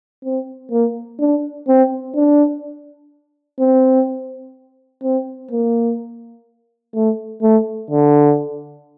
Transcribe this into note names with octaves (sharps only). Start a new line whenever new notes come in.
C4
A#3
D4
C4
D4
C4
C4
A#3
A3
A3
D3